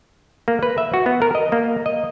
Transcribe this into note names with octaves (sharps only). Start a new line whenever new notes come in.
A#3
B4
E5
F#4
B3
A#4
D#5
A#3
D#5